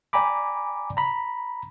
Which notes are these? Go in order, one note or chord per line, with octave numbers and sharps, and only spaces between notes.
D5 G5 G#5 A#5 B5 D6
A#5 B5